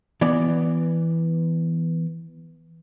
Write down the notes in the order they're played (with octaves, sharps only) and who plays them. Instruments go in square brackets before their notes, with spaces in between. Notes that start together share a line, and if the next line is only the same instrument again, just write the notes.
[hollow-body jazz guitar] E3 B3 D5